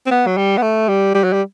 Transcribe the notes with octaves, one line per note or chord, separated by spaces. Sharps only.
C4
B3
F#3
G3
B3
A3
G3
G3
F#3
G3